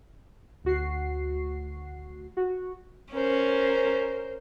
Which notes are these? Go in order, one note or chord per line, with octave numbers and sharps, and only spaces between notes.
D2 F#4 C7
F#4
C#4 A#4 C5